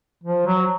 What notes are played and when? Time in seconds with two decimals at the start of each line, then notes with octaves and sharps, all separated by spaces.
0.23 F3
0.46 F#3